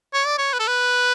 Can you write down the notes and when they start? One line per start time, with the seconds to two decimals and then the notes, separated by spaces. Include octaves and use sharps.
0.14 C#5
0.26 D5
0.38 C#5
0.53 B4
0.60 A4
0.67 B4